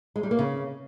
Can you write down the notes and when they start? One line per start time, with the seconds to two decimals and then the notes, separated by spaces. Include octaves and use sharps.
0.16 G#3
0.23 G3
0.31 A#3
0.39 C#3